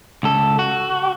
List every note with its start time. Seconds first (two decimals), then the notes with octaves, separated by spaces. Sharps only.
0.23 C#2 A4
0.59 F#4